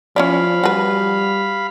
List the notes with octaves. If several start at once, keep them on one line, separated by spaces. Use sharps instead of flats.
F3 C#4 E4 D5 F5 B5
G3 F#4 B4